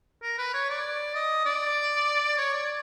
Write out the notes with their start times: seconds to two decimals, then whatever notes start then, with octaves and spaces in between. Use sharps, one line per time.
0.23 A#4
0.38 B4
0.54 C#5
0.70 D5
1.15 D#5
1.46 D5
2.38 C#5
2.54 D5